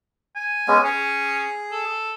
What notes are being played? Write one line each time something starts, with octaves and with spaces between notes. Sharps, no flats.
G#5
G#3 B3 C#4
C#4 G#4
A4